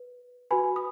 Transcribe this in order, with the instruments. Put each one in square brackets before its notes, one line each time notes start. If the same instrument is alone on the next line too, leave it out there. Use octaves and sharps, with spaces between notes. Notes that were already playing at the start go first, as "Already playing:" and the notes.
Already playing: [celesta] B4
F#4 B4 G#5 B5
D#6